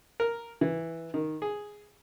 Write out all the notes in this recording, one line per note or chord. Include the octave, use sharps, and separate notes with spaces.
A#4
E3
D#3
G#4